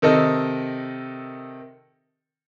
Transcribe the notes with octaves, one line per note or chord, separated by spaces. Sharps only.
C3 D#3 A4 D#5